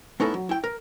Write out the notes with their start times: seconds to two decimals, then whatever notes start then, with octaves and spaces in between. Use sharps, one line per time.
0.20 A3 B3 C#4 D#4 E4 A4
0.34 F#3
0.49 E4 G5
0.64 A#4